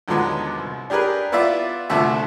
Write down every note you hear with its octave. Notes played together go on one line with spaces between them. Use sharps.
D#2 D3 F3 F#3 G#3 B3
C2
D4 G4 G#4 A#4 B4
B3 E4 F4 D5 E5
C2 D3 F3 A3 F#4 E5